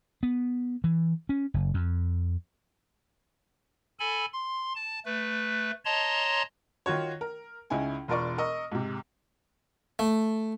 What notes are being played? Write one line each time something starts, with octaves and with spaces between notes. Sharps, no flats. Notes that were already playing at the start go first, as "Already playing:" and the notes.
B3
E3
C#4
F#1
F2
A4 G#5 B5
C6
A5
A3 B4
C#5 D#5 A5 A#5 C6
D#3 F4 F#4 C#5
A#4
C#2 C#4 D#4 E4 G#5
E1 F4 A#4 D5 C#6
A#4 D#5 C#6 E6
G#2 C3
A3